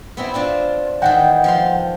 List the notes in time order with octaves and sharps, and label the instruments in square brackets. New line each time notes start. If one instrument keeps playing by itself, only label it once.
[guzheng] B3 C4 E4
C4 D4 F4
[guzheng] D#3 E3 G#3 [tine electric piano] F#5 G5
[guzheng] F3 F5 C6